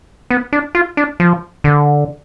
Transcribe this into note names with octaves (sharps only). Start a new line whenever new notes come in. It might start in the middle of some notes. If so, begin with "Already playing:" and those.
B3
D4
F4
D4
F3
D3